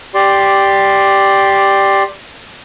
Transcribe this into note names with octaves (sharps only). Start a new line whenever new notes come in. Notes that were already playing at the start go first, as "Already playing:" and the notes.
G4 D5 C6